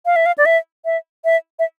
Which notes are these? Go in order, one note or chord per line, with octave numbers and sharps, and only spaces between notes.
F5
E5
F5
D5
E5
E5
E5
E5